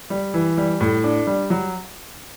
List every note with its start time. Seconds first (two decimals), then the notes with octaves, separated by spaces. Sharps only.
0.10 G3
0.34 E3
0.57 G3
0.81 A2
1.04 D4
1.27 G3
1.50 F#3